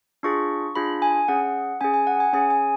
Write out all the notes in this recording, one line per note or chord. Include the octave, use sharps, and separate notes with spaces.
D4 F4 G#4 C#6
D4 F4 G#4 B5
G#5
C#4 G#4 F#5
C#4 G#4 G#5
G#5
F#5
G#5
C#4 G#4 G#5
G#5